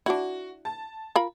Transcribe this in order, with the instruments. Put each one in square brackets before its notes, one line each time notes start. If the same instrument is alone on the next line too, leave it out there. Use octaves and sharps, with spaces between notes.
[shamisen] D4 E4 [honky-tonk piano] F#4
[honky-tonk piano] A5
[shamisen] F4 A#4 B5